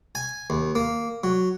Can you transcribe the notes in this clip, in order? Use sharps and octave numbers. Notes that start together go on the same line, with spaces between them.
G#5
D#2
A#3
F#3